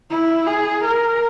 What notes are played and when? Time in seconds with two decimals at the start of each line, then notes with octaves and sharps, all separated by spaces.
0.10 E4
0.47 G#4
0.84 A#4